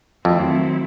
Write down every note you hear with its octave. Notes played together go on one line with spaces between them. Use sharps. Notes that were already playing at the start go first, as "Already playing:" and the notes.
F2 D#3 F#3 A3 C4 E4